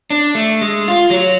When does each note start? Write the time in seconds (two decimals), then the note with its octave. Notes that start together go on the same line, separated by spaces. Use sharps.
0.10 D4
0.35 A3
0.62 G#3
0.88 F4
1.10 F#3